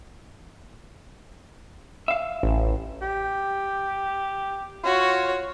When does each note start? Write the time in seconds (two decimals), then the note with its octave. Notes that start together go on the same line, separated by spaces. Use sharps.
2.08 E5 F5
2.43 A1
3.02 G4
4.84 F4 F#4 C#5